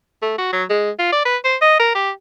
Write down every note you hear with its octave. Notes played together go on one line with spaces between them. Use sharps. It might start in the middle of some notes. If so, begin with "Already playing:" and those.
A3
F#4
F#3
G#3
F4
D5
B4
C5
D#5
A#4
G4